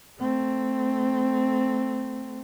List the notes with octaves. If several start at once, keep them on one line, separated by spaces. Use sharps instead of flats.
A3 C4